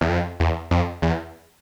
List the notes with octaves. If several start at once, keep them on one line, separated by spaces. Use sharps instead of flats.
E2
F2
E2
F2
E2